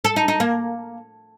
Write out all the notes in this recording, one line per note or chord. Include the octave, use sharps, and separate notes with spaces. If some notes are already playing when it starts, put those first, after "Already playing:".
A4
D#4
D#4
A#3